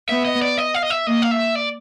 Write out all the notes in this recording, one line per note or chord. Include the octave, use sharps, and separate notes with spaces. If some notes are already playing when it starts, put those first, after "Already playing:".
B3 E5
D#5
D5
D#5
F5
D#5
E5
A#3 D#5
F5
E5
D5